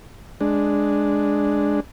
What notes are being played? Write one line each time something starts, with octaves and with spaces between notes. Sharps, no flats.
G#3 D4